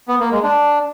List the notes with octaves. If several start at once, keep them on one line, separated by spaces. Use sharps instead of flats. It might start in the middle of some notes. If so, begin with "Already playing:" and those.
B3
A#3
G#3
D4